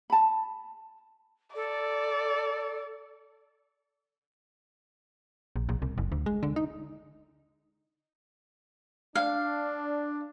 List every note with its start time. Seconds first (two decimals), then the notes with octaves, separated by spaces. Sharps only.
0.10 A5 B5
1.55 A4 D5
5.56 A#1
5.69 A#1
5.82 C2
5.98 F#1
6.12 D2
6.26 G#3
6.43 D3
6.56 D#4
9.15 D4 F5